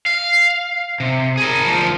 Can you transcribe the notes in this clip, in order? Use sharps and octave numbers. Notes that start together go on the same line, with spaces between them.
F5
C3
G#4 A#4
D2 F3